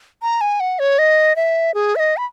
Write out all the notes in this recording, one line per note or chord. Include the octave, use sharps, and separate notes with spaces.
A#5
G#5
F#5
C#5
D#5
E5
G#4
E5
D#5
B5